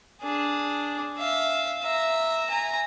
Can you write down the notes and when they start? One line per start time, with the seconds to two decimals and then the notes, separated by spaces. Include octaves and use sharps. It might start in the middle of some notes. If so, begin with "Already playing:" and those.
0.22 D4 G#4
1.18 E5 F5
1.82 E5 A#5
2.49 G#5 A#5